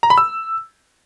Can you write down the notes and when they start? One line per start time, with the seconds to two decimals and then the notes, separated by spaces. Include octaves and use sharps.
0.03 A#5
0.10 B5
0.18 E6